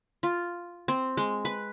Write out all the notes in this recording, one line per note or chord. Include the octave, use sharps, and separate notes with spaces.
F4
C4
G#3
B4